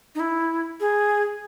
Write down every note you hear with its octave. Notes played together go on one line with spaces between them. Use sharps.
D#4
E4
G#4